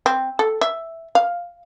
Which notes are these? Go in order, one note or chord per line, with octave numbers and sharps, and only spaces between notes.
C4
A4
E5
F5